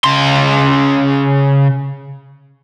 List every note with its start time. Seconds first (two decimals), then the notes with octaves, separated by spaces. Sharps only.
0.04 C#3 C6